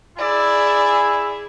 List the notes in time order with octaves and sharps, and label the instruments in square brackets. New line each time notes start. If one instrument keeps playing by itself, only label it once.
[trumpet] E4 [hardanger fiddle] G#4 [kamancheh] D5